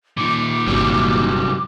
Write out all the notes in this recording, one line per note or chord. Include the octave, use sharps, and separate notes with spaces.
A#2 D#3 D6
G1 C3 F#3 G3